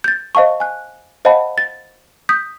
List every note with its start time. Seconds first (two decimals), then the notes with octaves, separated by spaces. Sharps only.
0.04 G6 A6
0.35 C5 D#5 F5 A5 C#6
0.60 G#5 F#6
1.25 C5 D#5 F5 F#5 A5 B5
1.58 A6
2.29 D#6 G6 B6